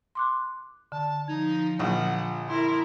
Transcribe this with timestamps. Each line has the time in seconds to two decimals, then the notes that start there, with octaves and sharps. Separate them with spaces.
0.15 C6 D6 F#6
0.92 D3 A5
1.28 F3 D#4 G#6
1.79 A#1 D3 F4 F#5
2.49 E4 A#4 C6